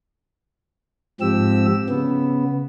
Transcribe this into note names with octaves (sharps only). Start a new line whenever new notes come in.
G#2 F3 C4 G4 E6
C#3 B3